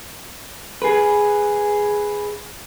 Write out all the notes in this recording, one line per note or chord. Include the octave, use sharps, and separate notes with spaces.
G#4 B4